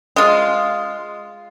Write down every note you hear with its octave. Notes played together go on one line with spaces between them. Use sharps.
G#3 F4